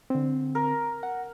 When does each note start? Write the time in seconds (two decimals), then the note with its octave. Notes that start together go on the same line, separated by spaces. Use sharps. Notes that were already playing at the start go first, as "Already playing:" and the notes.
0.10 D3 C4
0.55 A#4
1.03 F#5